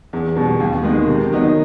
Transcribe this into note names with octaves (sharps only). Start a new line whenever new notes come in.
E2
B2 G3
D#2
D#3 G#3 B3
C3
D#3 F#3 B3 D#4